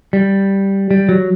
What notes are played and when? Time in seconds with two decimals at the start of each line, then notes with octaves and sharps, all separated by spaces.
0.13 G3
0.91 G3
1.09 F#3